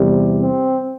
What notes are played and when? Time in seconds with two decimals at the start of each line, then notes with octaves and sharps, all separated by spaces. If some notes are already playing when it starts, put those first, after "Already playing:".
Already playing: E2 C3 G3
0.41 C4